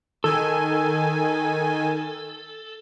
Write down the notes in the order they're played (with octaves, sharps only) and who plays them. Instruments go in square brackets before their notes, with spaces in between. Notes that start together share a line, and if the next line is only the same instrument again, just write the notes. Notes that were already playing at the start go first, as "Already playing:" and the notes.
[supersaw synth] D#3 G#5 [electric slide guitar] A4